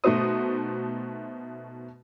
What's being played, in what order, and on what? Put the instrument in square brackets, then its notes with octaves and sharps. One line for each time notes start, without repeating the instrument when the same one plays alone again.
[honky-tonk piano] B2 A3 D#4 F#4 C5 D#6